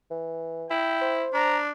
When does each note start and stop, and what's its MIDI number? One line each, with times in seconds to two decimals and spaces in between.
0.11 0.67 52
0.70 1.24 64
0.70 1.16 79
1.01 1.60 72
1.34 1.71 62
1.34 1.59 82